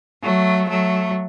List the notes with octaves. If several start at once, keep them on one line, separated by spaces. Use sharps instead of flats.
F#3 A3
F#3 A3